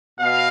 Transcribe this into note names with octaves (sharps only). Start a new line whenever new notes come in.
B2 F5